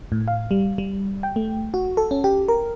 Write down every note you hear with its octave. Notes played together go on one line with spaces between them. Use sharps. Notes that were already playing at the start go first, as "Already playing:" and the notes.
A2
F5
G3
G3
G5
A3
F#4
A4
C#4
G4
A#4